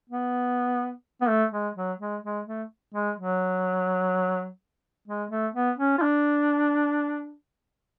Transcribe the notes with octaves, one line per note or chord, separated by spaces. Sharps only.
B3
B3
A3
G#3
F#3
G#3
G#3
A3
G#3
F#3
G#3
A3
B3
C#4
F4
D4